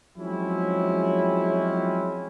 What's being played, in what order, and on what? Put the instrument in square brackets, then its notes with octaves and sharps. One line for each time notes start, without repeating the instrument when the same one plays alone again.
[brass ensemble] F3 F#3 G#3 C4 C#4 E4